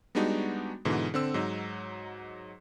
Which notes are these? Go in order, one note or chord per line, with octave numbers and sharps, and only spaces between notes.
G3 G#3 B3 D4 D#4 F#4
G#2 B2 D3 E3
D3 C4 E6
G#2 F#3 D#4